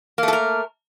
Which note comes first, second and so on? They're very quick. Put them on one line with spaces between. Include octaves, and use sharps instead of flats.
A#3 A3 A4 A#4